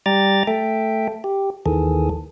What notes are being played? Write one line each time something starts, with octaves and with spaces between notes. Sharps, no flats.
G3 D5 G5 A#5 A6
A3 A4 E5 G5
G4
D#2 D#3 E3 G#4 A4